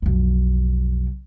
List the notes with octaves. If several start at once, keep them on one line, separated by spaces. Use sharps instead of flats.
B1 F2